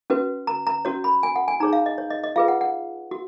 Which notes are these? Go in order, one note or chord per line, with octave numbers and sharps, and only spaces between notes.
C#4 F#4 B4
A#5
A#5
C#4 F#4 C#5
B5
G#5
F#5
G#5
D#4 G#4 C#5 A#5
F5
D#5
C#5
D#5
D#5
F4 G#4 B4 F5
F#5
F#5
F#4